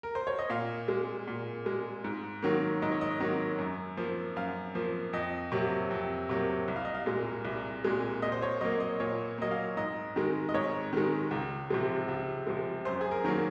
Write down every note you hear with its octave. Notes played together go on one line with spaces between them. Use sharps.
A#4
C5
C#5
D#5
A#2 F5
G#3
A#2
G#3
G#2
D#3 F#3 A#3
G#2 D#5
C#5
D#5
D#3 F#3 A#3
F#2
F3 A#3
F#2 F5
F3 A#3
F2 D#5
C3 F#3 A#3
F2
C3 F#3 A#3
C2
F5
D#5
F5
A#2 G#3
C2
A#2 G#3
A#2 D#5
C5
C#5
F#3 A#3 D#5
D#5
A#2 C#5
F#3 A#3 D#5
F5
G#2 D#5
D#3 G#3
D#5
G#2 C#5
D#3 G#3
C#2
C3 F3 G#3
C#2
C3 F3 G#3
F#2 C5
G#4
A#4
D#3 F#3 A#3